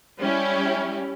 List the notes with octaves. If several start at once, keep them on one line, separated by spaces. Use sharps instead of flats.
G3 C#4 E4 G4